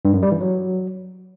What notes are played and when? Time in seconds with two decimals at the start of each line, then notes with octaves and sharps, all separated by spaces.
0.05 G2
0.14 F#2
0.23 G3
0.31 E3
0.40 F#3